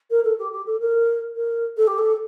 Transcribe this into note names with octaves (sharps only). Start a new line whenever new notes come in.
A#4
A4
G4
G4
A4
A#4
A#4
A4
G4
A4